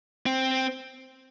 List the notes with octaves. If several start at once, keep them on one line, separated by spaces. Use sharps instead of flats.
C4